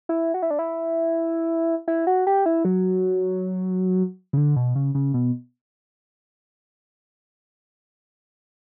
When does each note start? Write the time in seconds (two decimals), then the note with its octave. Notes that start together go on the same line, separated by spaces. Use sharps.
0.09 E4
0.34 F#4
0.42 E4
0.50 D4
0.59 E4
1.88 E4
2.07 F#4
2.27 G4
2.46 E4
2.65 F#3
4.33 C#3
4.37 D3
4.56 B2
4.75 C#3
4.95 C#3
5.14 B2